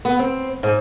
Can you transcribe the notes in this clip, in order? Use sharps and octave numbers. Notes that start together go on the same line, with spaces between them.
B3
C4
G#2